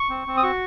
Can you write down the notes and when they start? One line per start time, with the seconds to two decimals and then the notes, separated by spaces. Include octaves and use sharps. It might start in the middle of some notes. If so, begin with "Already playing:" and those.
Already playing: C#6
0.10 C4
0.27 C4
0.37 D#6
0.43 F#4 C#6